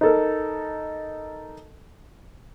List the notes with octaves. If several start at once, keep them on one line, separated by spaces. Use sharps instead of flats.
D#4 A4 A#4